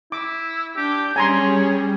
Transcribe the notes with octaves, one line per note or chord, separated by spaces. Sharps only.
E4 D6
D4 G4 G6
G3 C#4 G#4 C#5 G#5 A#5 C6